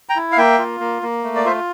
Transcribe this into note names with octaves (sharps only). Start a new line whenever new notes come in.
G5 A#5
E4
F5
A#3 E5 G5
F4
A#3
A#3
A3
D5
F4 C5 E5